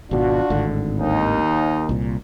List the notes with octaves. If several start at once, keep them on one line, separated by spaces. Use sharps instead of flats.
G#1 B2 D4 F4 F#4
G#1 A2 D3
D#2 D#4
C2 A#2